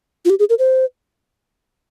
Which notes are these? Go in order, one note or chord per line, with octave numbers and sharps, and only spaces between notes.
F4
G4
G#4
A#4
C5